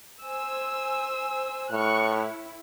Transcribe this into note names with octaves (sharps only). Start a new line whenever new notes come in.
C5 G#5 E6
A2 C#6 F6 F#6
E4